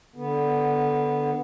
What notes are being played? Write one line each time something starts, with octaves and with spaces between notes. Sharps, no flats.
D3 B3